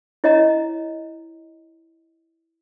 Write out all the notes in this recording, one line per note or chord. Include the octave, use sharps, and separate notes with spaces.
E4 C#5 D#5 A#5